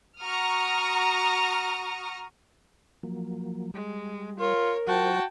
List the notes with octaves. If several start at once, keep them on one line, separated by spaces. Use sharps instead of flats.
F#4 A#5 C#6 D#6 F6
F3 F#3 A#3
G3 G#3
F4 A#4 C#5
F#3 F4 F#4 C5 G5 A5